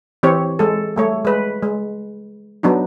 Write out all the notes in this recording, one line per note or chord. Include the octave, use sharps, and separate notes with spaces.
E3 C4 G4 C#5
G#3 A4
G3 A3 C#5
G#3 B4
G#3
F#3 B3 D4 D#4